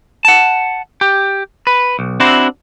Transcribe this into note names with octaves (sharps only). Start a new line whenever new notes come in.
F#5 A5
G4
B4
B1
C4 D4 E4 F#4 C5